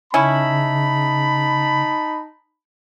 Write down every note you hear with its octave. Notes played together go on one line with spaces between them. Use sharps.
C#3 C#4 D#4 E4 A5 B5